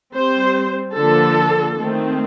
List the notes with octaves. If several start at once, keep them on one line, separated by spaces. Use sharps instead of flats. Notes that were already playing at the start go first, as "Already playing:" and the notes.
G3 C4 C5
D3 F3 A#3 A4
D#3 A3 C4